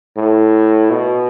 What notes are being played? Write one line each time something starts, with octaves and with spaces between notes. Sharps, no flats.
A2
B2